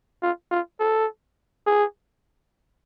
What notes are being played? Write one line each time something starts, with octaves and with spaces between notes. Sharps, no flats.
F4
F4
A4
G#4